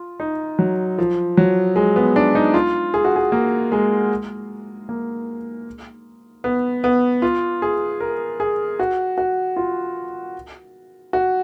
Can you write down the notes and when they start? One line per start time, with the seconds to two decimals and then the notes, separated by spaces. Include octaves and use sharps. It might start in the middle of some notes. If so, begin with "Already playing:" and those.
Already playing: F4
0.20 D#4
0.59 F#3
0.98 F3
1.37 F#3
1.76 G#3
1.96 B3
2.16 D4
2.35 D#4
2.54 F4
2.94 G#4
3.05 F#4
3.16 G#4
3.32 A#3
3.72 G#3
4.89 A#3
6.44 B3
6.84 B3
7.22 F4
7.62 G#4
8.00 A#4
8.40 G#4
8.80 F#4
9.18 F#4
9.56 F4
11.13 F#4